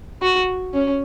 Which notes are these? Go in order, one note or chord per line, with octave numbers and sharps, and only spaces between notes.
F#4
C#4